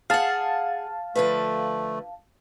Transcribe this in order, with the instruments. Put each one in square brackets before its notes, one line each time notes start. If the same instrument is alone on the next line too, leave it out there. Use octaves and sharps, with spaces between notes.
[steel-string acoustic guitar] G#4 F#5 [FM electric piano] F5 A5
[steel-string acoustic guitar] D3 F3 B4 [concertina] A3